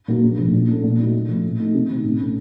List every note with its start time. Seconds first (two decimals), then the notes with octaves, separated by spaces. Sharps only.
0.08 A#2 F#3 A#3
0.23 A#1
0.39 A2 F3
0.53 A#2
0.68 A3 C#4 A4
0.83 A#2
0.98 F#3 A3 D#4
1.13 C#3
1.29 F3 A3
1.43 A2
1.58 A3 D#4
1.74 C3
1.89 D#3 A3 C4
2.04 A1
2.19 A2 A3 C#4